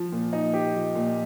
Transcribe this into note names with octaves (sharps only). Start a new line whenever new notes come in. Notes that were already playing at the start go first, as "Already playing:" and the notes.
Already playing: F3
A#2
D#4
G4
F3
A#2